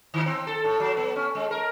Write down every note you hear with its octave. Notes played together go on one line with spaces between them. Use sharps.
D#3
C4
A4
A2
F#3
B3
C#4
G#3
A#4